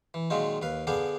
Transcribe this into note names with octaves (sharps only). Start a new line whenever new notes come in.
E3
A#2 D#3 F#3 G#3 D#4 F4
D#2 B4 F5
D3 B3 G#4 F5 G5 D6